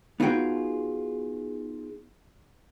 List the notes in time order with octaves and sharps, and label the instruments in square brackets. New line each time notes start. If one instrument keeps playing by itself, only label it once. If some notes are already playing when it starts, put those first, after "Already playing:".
[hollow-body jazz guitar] B3 D#4 F4 F#4 G#4 G5